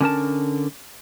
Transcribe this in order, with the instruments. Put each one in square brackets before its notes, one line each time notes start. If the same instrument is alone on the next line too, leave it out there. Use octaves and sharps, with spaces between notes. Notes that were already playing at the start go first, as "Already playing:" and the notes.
[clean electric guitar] D3 C#4 A#4 A5